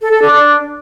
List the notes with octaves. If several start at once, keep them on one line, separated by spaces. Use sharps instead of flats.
A4
A4
D4